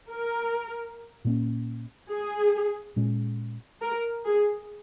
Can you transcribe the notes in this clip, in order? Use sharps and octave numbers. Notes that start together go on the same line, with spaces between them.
A#4
A#2 A#3 C#4
G#4
A#2 G#3 C#4
A#4
G#4